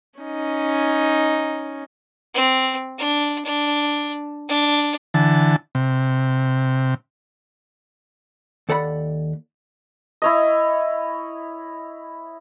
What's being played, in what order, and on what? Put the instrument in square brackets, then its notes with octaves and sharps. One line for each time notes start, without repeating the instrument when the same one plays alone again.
[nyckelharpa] C#4 D#4
[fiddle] C4
D4
D4
D4
[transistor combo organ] D3 E3 A5
C3
[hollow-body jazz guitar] D#2 A4 D5 F#5 B5
[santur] E4 C#5 D#5